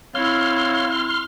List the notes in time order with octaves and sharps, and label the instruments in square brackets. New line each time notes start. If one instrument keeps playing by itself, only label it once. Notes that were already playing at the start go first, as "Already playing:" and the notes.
[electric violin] C4 E4 [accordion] C#5 F5 [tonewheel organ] C6 F6